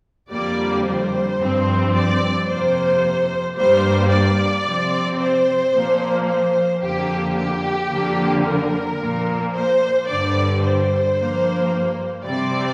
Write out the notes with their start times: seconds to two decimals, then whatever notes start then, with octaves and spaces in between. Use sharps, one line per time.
0.30 F2 D3 G3 A#3 D5
0.85 C5
1.39 G2 F3 C4
1.93 D5
2.48 F2 C3 A#3 C5
3.56 G2 G3 A#3 C5
4.10 D5
4.65 C3 F3 C4
5.19 C5
5.73 A#2 F3 A#3
6.27 C5
6.81 F2 D3 A#3 G4
7.36 G4
7.90 F2 D3 F3 A#3
8.45 A#4
8.99 A#2 F3 A#3
9.53 C5
10.07 G2 D3 G3 D5
10.62 C5
11.16 G2 F3 A#3
12.24 C3 G3 C4 D5